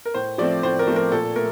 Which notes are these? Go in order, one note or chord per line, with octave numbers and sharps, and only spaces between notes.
A#4
A2 C5
F3 A3 C4 D5
A2 C5
A#4
F3 A3 C4
A#4
A#2 A4
A3 A#4